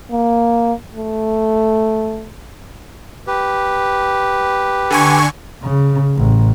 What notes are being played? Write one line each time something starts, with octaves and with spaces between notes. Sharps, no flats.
A#3
A3
G4 B4
D3 G#5 C#6
C#3
A1